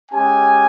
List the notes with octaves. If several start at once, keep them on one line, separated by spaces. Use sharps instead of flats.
G#3 C#4 G4 G#5